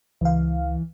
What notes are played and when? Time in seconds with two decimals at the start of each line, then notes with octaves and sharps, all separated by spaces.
0.21 C#2 E3 F5